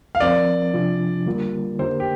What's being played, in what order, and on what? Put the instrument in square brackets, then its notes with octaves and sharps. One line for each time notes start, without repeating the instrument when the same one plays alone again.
[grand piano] F5
[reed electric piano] F3 C4 A#4 [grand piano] D5
[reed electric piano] C3 F3 D4 F4
D3 G3 A#3 F4 A#4
[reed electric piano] D3 A#3 G4 A#4 [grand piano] C5
[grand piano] G4